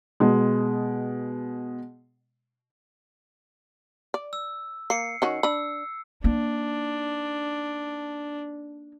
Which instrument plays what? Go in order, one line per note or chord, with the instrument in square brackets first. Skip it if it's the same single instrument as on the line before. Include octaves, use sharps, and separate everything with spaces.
[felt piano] B2 G#3
[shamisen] D5
[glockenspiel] E6
[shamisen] A#3 [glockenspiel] C7 C#7
[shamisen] D#3 C#4 F#4
[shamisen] D4 B5 [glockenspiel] E6
[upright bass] A#3 D#4 [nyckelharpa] D4